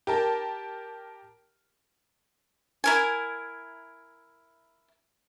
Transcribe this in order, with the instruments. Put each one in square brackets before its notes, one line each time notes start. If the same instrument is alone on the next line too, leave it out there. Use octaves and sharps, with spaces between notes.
[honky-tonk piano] G4 A#4 A5
[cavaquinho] E4 A#4 G#5